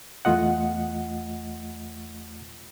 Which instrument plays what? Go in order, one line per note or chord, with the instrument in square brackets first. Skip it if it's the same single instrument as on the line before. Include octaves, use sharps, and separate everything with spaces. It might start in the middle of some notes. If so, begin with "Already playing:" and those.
[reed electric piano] E2 A3 F4 D#5 F#5